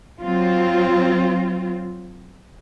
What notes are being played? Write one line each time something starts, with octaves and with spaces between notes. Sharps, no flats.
F#3 C4 F4